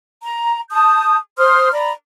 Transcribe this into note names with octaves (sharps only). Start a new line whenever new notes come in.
A#5
A5 D#6 G6
C5 C6 D#6 F6
D5 A#5 B5